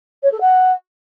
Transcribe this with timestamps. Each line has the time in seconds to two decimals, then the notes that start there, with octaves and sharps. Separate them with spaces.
0.23 C#5
0.32 A4
0.41 F#5